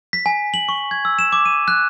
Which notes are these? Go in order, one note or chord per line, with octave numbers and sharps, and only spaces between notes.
B6
G#5
F#7
C#6
G#6
E6
E7
D6
D#7
F#6